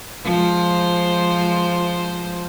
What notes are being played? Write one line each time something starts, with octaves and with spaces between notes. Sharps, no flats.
F3 G#3 C5